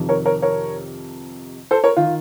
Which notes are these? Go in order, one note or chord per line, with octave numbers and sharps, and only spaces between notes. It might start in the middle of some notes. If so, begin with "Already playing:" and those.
Already playing: F2 C3 D#3
A#4 C#5
A#4 C#5
A#4 C#5
A4 C5
A#4 C#5
D#3 F4